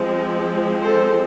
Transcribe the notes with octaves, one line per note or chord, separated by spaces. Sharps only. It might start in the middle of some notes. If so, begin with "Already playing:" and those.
Already playing: F3 G#3 C4
A4 C5